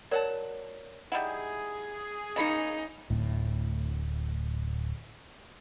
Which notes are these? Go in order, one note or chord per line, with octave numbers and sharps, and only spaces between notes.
F#3 A#4 C#5 D5 F#5 A5
G3 D#4 E4 G#4 F#5
C#3 A#3 D#4 D#5 B5 C#7
D1 A2